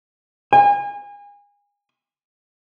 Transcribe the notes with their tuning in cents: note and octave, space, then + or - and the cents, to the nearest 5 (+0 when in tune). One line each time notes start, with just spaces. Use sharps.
G#5 -30